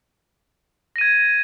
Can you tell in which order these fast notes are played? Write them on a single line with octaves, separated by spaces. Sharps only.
A#6 D#7 G#6